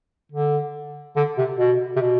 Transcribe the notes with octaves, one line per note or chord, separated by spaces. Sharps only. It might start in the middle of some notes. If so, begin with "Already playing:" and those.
D3
D3
C3
B2
C3
B2